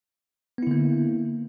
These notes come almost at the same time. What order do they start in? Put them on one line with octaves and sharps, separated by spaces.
B3 E4 D3 A#3